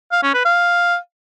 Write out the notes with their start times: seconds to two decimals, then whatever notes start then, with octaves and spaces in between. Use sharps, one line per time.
0.12 F5
0.23 C#4
0.34 B4
0.45 F5